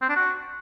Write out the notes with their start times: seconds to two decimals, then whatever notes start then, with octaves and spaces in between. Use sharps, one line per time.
0.02 C4
0.09 D4
0.16 F#4